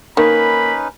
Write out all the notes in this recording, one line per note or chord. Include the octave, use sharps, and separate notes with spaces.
D#3 A#3 C#4 D#4 B4 B5